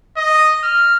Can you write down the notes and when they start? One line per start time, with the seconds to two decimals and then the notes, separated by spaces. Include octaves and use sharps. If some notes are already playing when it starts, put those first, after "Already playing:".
0.17 D#5
0.63 F6